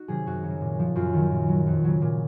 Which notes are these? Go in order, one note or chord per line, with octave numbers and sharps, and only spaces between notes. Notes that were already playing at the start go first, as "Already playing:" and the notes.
Already playing: D#4 F#4
C3 D#3 F#3 G#4
F#2 F#4
C#3 F#3
A#2
F3
F#2 F4
D#3 F#3
A#2
F#3
F2
C#3 F#3
A#2